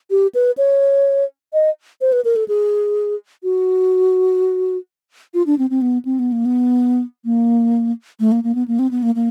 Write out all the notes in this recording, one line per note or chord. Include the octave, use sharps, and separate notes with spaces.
G4
B4
C#5
D#5
C5
B4
A#4
A4
G#4
F#4
F4
D4
C4
C4
B3
C4
B3
A#3
B3
A#3
A3
A#3
A#3
B3
A#3
C4
B3
A#3
A#3